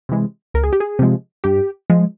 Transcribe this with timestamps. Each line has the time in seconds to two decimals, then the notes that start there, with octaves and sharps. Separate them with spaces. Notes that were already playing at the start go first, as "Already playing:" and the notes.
0.09 C3 E3 G#3
0.54 C#2 A#4
0.63 G#4
0.73 G4
0.80 G#4
0.99 C3 F3 G#3
1.44 G2 G4
1.90 F3 G#3